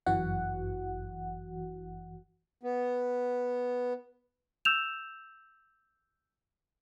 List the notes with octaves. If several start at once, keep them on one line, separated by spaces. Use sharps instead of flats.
G1 F#2 E3 F#4 F#5
B3
E6 G6 E7 F7